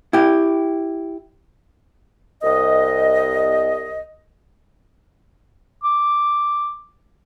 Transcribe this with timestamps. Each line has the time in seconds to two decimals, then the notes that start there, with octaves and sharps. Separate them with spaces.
0.13 E4 G4
2.43 C2 D#5
5.83 D6